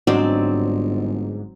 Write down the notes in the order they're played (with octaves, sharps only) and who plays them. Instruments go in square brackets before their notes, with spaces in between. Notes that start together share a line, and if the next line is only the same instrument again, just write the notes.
[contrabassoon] G1 [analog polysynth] G#2 [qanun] F#3 C4 D5 [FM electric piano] D4 F#4 D#5